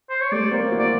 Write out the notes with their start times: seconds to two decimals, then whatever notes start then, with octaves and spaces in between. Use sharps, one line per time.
0.10 C5
0.21 C#5
0.32 G3 A3 D5
0.52 A#3 C4
0.71 E4 F#4
0.79 D5